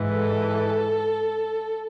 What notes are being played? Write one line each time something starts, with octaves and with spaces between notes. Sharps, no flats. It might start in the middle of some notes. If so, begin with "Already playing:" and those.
Already playing: G#2 E3
A4